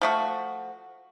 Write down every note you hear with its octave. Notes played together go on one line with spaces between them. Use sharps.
F3 A3 F#4